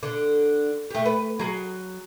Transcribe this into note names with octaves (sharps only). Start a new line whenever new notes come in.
D3
A3 G4
B4
F#3 G#4